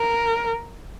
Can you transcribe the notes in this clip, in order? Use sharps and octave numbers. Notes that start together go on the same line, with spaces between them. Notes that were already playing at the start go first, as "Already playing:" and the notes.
Already playing: A#4